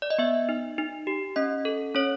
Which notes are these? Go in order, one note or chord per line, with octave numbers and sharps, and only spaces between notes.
D5
D#5
B3 E5
D#4
D#4
G4
C#4 D#5
A4
C#4 C#5